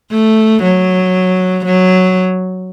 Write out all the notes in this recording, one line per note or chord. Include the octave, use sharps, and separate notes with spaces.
A3
F#3
F#3